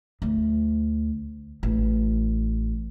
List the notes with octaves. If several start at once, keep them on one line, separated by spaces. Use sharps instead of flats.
D2
A1